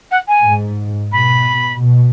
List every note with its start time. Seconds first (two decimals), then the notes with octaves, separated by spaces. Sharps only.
0.11 F#5
0.28 G#5
0.44 G#2
1.11 B2 B5
1.79 B2